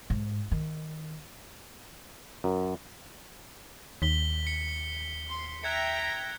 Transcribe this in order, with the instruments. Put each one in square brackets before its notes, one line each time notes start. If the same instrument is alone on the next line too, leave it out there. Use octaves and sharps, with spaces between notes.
[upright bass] G#2
D#3
[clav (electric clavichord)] F#2
[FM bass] D#2 [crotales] B6 G7
[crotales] C#7
[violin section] C6
[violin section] E5 G5 A#5 [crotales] F#6 G#6 C#7